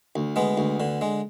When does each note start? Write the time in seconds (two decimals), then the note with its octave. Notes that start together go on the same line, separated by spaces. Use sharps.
0.16 D2
0.36 G#3 B3
0.58 D2
0.80 D3
1.01 G#3